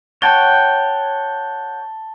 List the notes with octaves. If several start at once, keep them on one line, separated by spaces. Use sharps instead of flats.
C#5 F#5 G5 A5 A6 G7